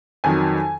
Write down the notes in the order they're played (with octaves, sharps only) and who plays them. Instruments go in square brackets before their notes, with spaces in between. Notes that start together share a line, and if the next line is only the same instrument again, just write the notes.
[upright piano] F2 D#3 F#3 G#5